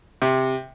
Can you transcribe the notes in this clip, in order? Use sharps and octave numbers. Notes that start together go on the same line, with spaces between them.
C3